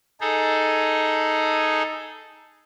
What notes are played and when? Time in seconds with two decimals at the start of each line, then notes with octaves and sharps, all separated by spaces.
0.21 D#4 G#4 A4